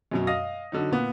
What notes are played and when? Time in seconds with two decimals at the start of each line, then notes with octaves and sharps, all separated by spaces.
0.11 F#2 B2 F#3
0.27 D#5 F5 D#6 A#6
0.72 D3 F#3 D#4
0.91 A#2 B3